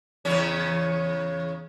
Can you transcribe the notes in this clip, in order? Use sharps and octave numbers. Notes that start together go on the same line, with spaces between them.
E2 C#3 C#4